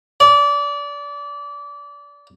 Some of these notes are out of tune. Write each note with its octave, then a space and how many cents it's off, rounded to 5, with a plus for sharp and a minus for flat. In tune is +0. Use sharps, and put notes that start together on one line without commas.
D5 -25